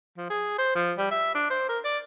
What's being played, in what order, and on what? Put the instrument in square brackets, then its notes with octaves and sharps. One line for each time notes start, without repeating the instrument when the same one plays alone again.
[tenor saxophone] F3
G#4
C5
F3
G3
E5
D4
C5
A#4
D5